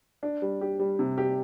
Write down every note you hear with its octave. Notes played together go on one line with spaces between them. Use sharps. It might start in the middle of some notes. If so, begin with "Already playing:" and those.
D4
G3
G4
G3
C3
G4